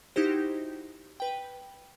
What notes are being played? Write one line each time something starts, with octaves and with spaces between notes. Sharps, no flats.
D#4 E4 F#4 G4 C5
B4 G5